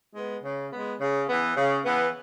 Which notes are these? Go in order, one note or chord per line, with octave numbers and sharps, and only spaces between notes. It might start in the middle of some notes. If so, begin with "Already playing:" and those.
G#3 B3
C#3
G#3 B3
C#3
E3 B3
C#3
E3 B3